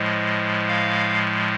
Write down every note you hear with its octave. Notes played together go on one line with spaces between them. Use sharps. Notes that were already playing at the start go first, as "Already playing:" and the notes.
Already playing: A2 F3 G#3
F5